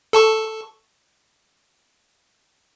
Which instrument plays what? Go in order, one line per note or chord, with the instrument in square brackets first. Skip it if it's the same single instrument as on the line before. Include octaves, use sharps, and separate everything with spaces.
[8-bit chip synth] A4 A5 C#6